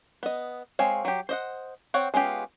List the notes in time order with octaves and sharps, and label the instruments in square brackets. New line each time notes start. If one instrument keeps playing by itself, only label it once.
[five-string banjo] B3 D#5
G#3 C4 C#5 F5
F#3 G4
C5 D#5 F#5
C4 C#5 F#5 G5
G#3 B3 C#4 F4 G4